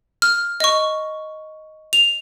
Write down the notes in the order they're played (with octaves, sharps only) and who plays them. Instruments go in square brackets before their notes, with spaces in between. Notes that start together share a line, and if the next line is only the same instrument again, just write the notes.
[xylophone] F6
D#5 C#6
F7